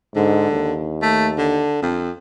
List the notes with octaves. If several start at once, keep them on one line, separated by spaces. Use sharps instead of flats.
G#2 D3
D#2
A3
D3
F2